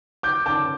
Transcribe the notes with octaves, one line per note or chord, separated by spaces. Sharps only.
D6 G6
A5 D6